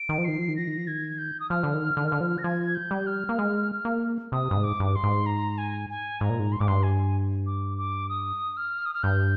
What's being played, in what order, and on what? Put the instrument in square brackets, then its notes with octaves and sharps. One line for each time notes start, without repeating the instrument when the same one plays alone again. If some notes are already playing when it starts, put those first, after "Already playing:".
Already playing: [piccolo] D7
[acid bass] D#3
F3
[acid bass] D#3 [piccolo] C7
[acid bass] F3
D#3
[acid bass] F3 [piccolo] A#6
[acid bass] D#3
F3
[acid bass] D#3 [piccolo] G#6
[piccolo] G6
D#6
[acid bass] F3 [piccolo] F6
[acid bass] D3
D#3
D3
D#3
D3
F3
[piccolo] A#6
[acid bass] F3 [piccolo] G#6
[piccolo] G6
[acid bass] G3
[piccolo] F6
[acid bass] A#3
G#3
A#3
[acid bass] C3 [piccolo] D#6
[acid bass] G2
G#2
[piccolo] D6
[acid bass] G2
[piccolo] D6
C6
[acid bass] G#2
[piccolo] A#5
G#5
G#5
[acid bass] G#2 [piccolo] A#5
[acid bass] A#2
G#2
[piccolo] C6
[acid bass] G#2 [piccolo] D6
[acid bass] G2 [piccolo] C6
[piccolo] G#5
D6
D6
D#6
F6
D#6
F6
[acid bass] G2 [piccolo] G6